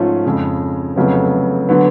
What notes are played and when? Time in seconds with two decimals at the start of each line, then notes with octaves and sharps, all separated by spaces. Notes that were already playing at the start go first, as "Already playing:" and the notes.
Already playing: G#2 F3 A3 C#4 F4
0.25 F2 C#3 G#3
0.96 F1 F2 C#3 F#3 B3
1.69 D3 F#3 B3